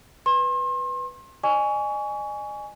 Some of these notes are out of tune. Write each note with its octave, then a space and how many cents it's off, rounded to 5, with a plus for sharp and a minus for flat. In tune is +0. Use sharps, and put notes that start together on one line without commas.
B4 +0 C6 +35
D#5 -45 G#5 +0 C#6 +25